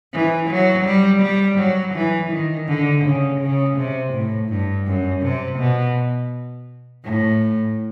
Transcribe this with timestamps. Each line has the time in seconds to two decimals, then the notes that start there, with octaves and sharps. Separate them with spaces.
0.14 E3
0.50 F#3
0.86 G3
1.22 G3
1.59 F#3
1.95 E3
2.31 D#3
2.69 D3
3.05 C#3
3.41 C#3
3.77 C3
4.14 A2
4.49 G2
4.87 F#2
5.22 C3
5.59 B2
7.04 A2